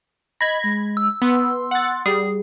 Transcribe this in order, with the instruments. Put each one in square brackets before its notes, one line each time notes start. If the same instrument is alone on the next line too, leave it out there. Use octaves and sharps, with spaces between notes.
[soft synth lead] D#5 [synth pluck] B5 G#6 [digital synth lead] A#6
[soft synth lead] G#3
[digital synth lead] E6
[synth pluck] B3 [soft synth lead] C6
[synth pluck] F#5 A6
[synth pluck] G3 [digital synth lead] G#4